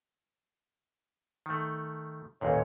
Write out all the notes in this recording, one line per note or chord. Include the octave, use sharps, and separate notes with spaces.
D#3 A3
A1 D#2 A#2 C#5 G#5